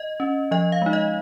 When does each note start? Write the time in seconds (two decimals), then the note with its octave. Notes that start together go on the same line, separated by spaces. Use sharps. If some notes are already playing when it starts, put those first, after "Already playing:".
Already playing: D#5
0.20 C#4
0.51 F3 D#5
0.72 F5
0.82 G#3 D#4
0.93 D#5